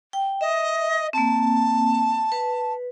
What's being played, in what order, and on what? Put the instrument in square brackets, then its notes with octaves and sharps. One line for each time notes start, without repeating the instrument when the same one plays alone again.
[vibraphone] G5
[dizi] D#5 [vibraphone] E5
[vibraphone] A#3 C4 [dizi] A5
[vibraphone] B4